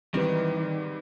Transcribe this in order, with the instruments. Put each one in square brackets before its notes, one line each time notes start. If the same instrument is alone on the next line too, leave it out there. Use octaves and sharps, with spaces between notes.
[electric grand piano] G#2 G3 [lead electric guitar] D#3 [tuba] E3 [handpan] C4 D#4 B4